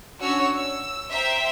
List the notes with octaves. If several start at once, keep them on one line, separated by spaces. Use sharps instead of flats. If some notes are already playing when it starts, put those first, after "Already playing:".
C#4 D4 F#4 C#5 E6
E6
C5 E5 G5 A#5